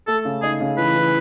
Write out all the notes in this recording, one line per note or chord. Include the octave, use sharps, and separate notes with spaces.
A3 A4
C#3
D#4 G#4
C#3
E3 B4
E3